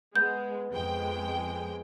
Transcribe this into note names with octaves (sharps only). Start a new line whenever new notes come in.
G#3 B3 G6
F2 G#3 G5
G#4